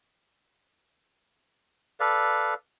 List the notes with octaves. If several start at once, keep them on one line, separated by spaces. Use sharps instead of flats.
A4 B4 D5 F5